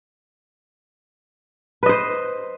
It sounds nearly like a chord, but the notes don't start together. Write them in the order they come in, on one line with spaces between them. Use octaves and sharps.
B4 D#5 C5